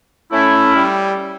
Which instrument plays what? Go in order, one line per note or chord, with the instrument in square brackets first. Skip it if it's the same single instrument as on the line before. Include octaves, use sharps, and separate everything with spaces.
[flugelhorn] A3 [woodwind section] C#4 E4
[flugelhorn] G3